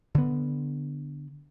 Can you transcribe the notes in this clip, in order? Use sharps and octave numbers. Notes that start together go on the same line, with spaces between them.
D3 B3